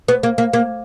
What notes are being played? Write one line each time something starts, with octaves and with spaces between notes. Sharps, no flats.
B3
A#3
A#3
A#3